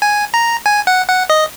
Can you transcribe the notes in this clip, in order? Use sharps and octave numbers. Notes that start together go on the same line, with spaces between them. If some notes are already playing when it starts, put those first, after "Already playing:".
G#5
A#5
G#5
F#5
F#5
D#5